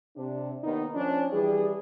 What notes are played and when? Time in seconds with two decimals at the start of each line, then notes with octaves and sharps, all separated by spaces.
0.16 C3 D4
0.63 D#2 D#3 B3 D#4
0.94 F3 C#4 D4
1.32 E3 G3 G#4